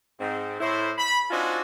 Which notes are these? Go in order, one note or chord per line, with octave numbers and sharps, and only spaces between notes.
G#2 C4
A2 E4 C5
B5
C4 D4 D#4 F4 F#4 G#5